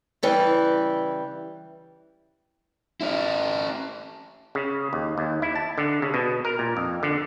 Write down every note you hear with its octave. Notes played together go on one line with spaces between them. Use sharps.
C#3 E3 G3
C#4 E4
C#3
D#2
D#2
E4
A5
D3
C#3
B2
A#4
A#2
F2
D3